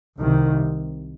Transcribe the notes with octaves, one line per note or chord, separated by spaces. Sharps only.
C2 C3 D#3